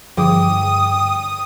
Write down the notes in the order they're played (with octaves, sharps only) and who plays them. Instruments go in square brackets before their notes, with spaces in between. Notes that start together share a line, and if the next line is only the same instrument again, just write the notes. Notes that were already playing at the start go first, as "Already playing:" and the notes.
[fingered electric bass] G2 D3 [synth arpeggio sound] F3 G#4 D6 [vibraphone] G5 [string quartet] D#6